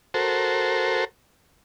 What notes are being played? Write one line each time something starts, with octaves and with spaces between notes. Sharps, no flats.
F#4 A4 A#4 C5